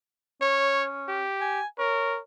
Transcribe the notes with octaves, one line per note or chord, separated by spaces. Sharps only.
C#4 C#5
G4
G#5
A#4 C#5